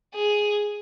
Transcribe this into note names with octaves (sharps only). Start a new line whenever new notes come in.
G#4